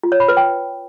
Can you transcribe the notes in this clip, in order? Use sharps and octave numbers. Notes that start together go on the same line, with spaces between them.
F4
C#5
B5
B4
G5